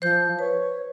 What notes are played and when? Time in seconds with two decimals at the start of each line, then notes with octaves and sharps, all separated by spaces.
0.02 F3 C5 G6
0.39 B4 C#5